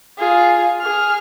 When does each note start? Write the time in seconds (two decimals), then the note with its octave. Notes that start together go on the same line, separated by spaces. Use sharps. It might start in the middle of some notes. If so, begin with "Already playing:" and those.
0.18 F4 G#4
0.81 G#4 F6